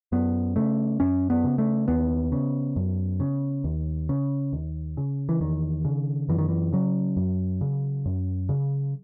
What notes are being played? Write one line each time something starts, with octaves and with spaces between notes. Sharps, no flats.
F#2 B3
C#3 A3
F#2 C#4
B3
C#3
A3
D#2 B3
C#3
F#2
C#3
D#2
C#3
D#2
C#3
E3
E2 D#3
C#3
F#2 E3
D#3
E3
C#3 F#3
F#2
C#3
F#2
C#3